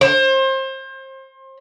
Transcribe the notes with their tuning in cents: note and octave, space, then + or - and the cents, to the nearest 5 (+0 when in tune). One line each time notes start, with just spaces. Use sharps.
C5 +30